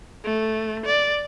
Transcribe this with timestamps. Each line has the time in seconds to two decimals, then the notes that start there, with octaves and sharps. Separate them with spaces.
0.24 A3
0.86 D5